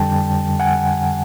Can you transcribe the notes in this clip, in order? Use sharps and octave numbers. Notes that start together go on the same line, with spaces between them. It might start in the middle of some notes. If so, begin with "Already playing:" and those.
Already playing: F2 D3 G3 G5 A5
F#5 G#5